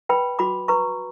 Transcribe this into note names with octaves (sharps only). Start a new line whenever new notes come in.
B4 G5 B5
F#4 B5 D6
B4 A#5 C#6